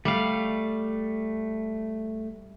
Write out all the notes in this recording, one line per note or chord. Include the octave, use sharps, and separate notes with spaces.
G3 A3 F5